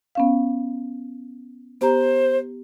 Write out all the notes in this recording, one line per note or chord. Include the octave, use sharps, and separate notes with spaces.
B3 C#4 F5
B3 G4 C5 A#5